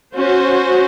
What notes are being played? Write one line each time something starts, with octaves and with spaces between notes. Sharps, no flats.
C#4 F#4 C5